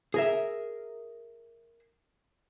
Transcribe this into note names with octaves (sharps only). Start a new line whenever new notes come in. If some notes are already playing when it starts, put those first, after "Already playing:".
G#4 A#4 E5